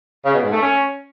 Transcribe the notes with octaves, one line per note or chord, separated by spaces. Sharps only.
C#3
B2
G#2
A3
C#4